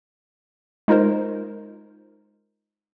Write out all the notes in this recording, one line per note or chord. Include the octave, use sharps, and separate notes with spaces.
G#3 D#4 F4 A#4 C5